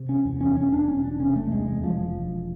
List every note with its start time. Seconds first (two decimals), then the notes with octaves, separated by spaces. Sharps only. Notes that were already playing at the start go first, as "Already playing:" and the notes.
Already playing: C3
0.09 C#4
0.25 E2
0.41 C#4
0.56 E1 C#4
0.72 D4
0.88 E1 C#4
1.04 D4
1.19 C3 C#4
1.36 A3
1.52 E2 G#3
1.68 G#3
1.83 E1 F3
2.15 E1